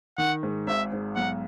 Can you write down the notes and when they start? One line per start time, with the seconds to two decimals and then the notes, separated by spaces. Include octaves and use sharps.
0.18 D#3 F#5
0.43 G#2
0.67 G#1 E5
0.92 G#2
1.16 B1 F#5